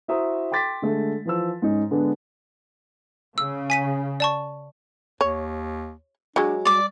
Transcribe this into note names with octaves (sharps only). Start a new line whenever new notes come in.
E4 F#4 C5 E5 A#5 D#6
G5 C6 D6 A6 B6
D3 G#3 A3
E3 F3 E6
G#2 C#4 D#4
D3 G#3 B3 D4
C#3 E6
G#5 B6 D#7
D5 A5 C#6
D#2 C#5
F#3 G#3 D4
G3 D5 D6